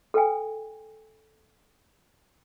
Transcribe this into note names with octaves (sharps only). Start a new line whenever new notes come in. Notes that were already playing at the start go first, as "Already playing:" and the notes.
A4 B4 G5 G#5